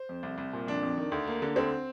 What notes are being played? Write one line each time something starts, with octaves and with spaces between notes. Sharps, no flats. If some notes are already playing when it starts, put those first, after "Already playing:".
Already playing: C5
F2
C2
C2
A#2
F2 D4
F2
D#3
D2
A#3
D3
D2 C4